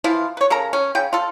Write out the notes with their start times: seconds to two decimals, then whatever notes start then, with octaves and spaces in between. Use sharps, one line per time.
0.04 E3 F3 E4 F4
0.37 B4 C#5
0.50 C#3 A4 A#4 A#5
0.73 C#4
0.95 C#3 G5
1.13 F4 A4